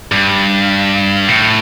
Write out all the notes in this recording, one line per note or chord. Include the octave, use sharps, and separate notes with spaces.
G2
A2